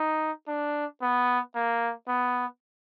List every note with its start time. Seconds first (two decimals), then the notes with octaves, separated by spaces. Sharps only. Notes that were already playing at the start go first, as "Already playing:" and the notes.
Already playing: D#4
0.48 D4
1.02 B3
1.55 A#3
2.08 B3